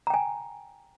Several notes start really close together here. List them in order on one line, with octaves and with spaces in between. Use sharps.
A#5 G5 G#5